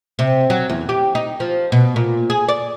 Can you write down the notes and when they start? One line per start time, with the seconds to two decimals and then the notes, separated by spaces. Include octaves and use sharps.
0.19 C3
0.50 F#3
0.70 E2
0.89 G4
1.15 D#4
1.40 F3
1.72 B2
1.96 A#2
2.30 G#4
2.49 D5